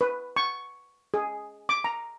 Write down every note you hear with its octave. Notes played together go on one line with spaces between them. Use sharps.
B4
C#6
G#4
D6
A#5